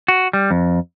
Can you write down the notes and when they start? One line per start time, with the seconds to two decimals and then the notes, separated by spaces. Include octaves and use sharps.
0.08 F#4
0.33 G3
0.51 F2